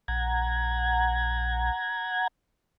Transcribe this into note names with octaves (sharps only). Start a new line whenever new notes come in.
A#1 F#5 A#5 G#6